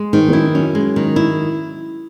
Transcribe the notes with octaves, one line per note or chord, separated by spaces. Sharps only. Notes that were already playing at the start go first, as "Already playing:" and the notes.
Already playing: G#3
G#2 D#3
E2
F#2 E4
F#2 C#4
G#3
D#3
E4